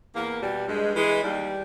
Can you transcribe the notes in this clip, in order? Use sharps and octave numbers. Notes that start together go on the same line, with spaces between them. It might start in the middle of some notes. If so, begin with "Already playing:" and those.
E2 A#3
B2 G3
G2 G#3
E3 G#3
D#2 G3